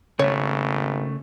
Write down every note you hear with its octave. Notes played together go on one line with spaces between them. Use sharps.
G#1 C#3 A3 C#5